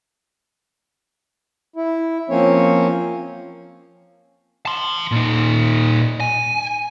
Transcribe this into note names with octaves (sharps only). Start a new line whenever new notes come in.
E4
F3 A#3 C4 C#4 C#5
A5 C6
A#2 D#4
G#5